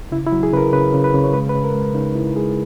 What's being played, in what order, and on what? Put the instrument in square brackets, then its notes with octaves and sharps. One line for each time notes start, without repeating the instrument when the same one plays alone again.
[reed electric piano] C#3 E4
E4
F#3
G#4
C#3 B4
A#4
C#3 B4
C#3
B4
C#3
C#5
G#3 B4
B4
C#3
A#4
G#3
C#3 D#4
C#3 E4
G#3 G#4